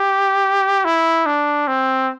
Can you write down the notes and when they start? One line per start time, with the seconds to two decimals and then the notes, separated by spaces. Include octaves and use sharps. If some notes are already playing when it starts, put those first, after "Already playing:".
Already playing: G4
0.85 E4
1.26 D4
1.68 C4